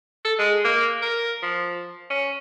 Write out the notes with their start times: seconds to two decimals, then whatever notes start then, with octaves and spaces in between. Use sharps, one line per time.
0.25 A4
0.39 G#3
0.64 A#3
1.02 A#4
1.43 F3
2.10 C#4